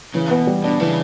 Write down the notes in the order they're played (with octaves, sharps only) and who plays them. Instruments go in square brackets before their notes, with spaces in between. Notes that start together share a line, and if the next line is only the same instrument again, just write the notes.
[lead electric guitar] C#3 [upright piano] E3
[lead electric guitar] B2 [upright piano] B3
[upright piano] G3
[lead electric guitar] B2 [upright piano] D4
[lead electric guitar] C#3 [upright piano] E3